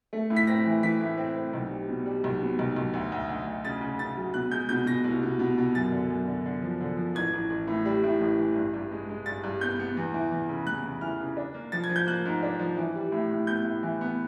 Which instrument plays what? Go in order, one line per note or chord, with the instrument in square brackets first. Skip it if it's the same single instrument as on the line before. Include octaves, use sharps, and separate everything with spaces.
[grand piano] A3
A2
B6
C4 A#6
E3
E3 B6
A2
C4
C4
B1
G3
B2
G3
B1
B2
B1
B1
D2
D2
D2
D2
C#3 A6
C#3
C#3 A6
F#3
B2 F#6
G#3 G6
B2 G6
B2 A#6
C2
B2
B2
B2
F#2 A6
D3
F#2
D3
D3
F3
D3
F3
A1 G#6
A1
A1
A2
G3
A2
A1
E3
G2
G2
G#3
G#3
G2 A6
G2
B3 G6
B3
E2
E3
E2
C#3
E2 F#6
C#3
E3 F6
C#3
D4
A#3
F3 A6
G#6
F3
G6
A#3 F#6
G#2
D4
F3
E3
G3
A2
A2
B3 G6
A2
E3
B3